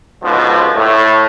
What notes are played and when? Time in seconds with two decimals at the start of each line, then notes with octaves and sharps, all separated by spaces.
0.23 C#2 G#2 B2 D3 F3
0.75 A2